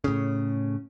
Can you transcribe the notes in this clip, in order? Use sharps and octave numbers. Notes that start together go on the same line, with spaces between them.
A2 C#3